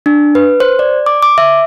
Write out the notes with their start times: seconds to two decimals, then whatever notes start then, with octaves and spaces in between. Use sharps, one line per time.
0.06 D4
0.35 B4
0.60 C5
0.79 D5
1.06 D6
1.22 D6
1.38 E5